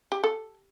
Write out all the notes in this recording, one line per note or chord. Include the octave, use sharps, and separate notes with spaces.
G4
A4